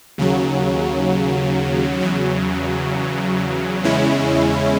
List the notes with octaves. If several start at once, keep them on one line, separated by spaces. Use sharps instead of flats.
D#2 C#3 F#3
E2 C#3 F#3
E2 C#3 G#3 C#4 E4